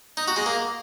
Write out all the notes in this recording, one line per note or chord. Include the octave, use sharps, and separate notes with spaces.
D#4
F#4
G#3
A#3